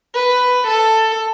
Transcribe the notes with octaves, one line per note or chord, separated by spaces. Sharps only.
B4
A4